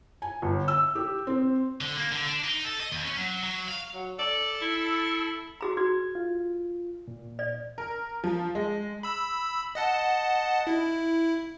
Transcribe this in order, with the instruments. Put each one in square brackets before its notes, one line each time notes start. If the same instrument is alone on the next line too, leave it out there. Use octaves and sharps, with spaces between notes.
[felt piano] G#5
G1
E6
G4
C4
[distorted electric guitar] D3
A#3
D3
D4
D#4
A4
D#5
D#2
C#4
F#3
F#3
F5
[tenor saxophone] F#3
[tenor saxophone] A4 [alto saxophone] D5
[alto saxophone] E4
[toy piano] F#4 G#4 A#5
[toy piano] F#4 [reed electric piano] G#6
[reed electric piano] F4
A#2
[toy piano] D5
[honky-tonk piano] A#4
F3
G#3
[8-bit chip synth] B5 E6
D#5 F#5 A5
E4